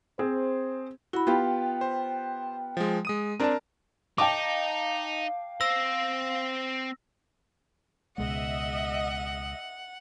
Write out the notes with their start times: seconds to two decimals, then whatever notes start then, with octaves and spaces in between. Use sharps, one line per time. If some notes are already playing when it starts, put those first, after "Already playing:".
0.19 C4 G#4 C5
1.13 E4 F#4 B5
1.27 B3 F4 G4 G5
1.81 C5
2.77 F3 G#3
3.05 G#3 D#6 D#7
3.40 C4 D4 A#4 D5 A5
4.18 D#4 F5 G5 A5 D6
5.61 C4 C5 E6 A#6
8.18 C#2 B2 G#3 D#5 E5 F#5